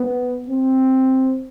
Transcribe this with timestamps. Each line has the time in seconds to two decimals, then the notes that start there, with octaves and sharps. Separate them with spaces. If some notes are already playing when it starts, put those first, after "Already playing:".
Already playing: B3
0.48 C4